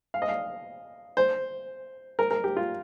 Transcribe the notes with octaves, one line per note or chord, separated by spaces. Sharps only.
F5
D#5
F5
C5
A#4
A#4
G4
F4